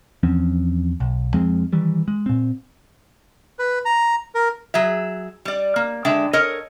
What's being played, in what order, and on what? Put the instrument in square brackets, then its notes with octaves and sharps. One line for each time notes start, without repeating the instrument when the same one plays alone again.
[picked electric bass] E2 F3 C4 C#4
B1
F2 F3 G#3 C4
D#3 E3 G3
G#3
A#2 C4
[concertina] B4
A#5
A#4
[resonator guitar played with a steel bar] F#3 G#4 E5
G3 D5
A#3
D3 G#3 D4 E5 G5
A4 A#4 C#5 D#5